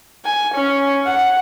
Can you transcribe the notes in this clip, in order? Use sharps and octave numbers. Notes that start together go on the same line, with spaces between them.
G#5
C#4
F#5